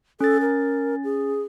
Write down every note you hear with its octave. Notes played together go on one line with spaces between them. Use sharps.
C#4 A4 A6
A#4
G#4